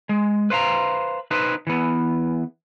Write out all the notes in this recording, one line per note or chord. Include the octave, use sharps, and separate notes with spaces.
G#3
B4 C5 F5 A#5
D#4 B4 C5
E3 B3